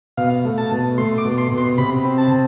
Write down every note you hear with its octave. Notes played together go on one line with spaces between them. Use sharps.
B2 F5
A3
A5
B2
A3 C6
D6
B2
C6
B2
C6
C3 B5
C4
A5
C3